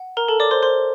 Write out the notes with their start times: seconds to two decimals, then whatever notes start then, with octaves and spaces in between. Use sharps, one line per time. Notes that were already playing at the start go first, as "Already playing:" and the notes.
Already playing: F#5
0.17 A#4 A#5
0.28 A4 A5
0.40 C#5 D5 D6
0.51 C5 C6
0.63 A#4 C5 C6